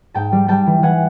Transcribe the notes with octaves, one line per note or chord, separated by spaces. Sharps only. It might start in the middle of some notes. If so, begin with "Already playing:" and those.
G#2 G5 A5
G3
G3 G5 A5
E3
E3 F#5 G#5